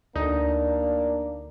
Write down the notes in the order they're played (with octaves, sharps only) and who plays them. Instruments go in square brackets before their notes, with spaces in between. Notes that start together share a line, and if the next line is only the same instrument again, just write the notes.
[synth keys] D2 [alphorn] A#3 [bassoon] D4 [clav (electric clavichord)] D#4